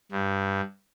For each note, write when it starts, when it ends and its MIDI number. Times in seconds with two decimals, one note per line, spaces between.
0.11 0.61 43